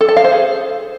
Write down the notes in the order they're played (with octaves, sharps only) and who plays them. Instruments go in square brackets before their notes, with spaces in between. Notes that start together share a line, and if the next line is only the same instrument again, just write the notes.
[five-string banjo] A4
A5
F5
C5
G#4